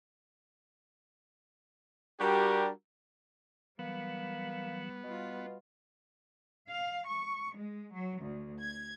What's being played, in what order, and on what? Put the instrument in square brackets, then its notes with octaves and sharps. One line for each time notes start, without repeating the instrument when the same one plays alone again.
[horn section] G3 D4 F#4 G4 A#4
[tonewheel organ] E3 F#3 [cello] G3 [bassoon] A#3 [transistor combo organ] B3
[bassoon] B2 [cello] G3 F4
[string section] F5
C#6
G#3
F#3
D2
G#6